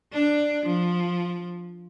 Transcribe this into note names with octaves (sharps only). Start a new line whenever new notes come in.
D4
F3